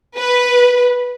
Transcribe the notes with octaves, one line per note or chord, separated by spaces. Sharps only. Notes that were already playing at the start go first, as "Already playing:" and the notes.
B4